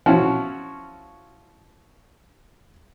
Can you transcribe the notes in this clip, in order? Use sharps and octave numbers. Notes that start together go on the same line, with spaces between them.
F3 C#4 E4 F#4